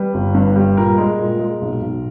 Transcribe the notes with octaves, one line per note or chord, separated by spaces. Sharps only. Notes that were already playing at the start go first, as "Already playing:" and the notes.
Already playing: G3 B4
G1
G2
G3
A#2 A#4
G#3
A#2
G#3
B1
B1